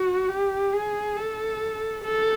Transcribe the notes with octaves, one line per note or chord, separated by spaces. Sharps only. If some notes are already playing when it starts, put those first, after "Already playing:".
Already playing: F#4
G4
G#4
A4
A4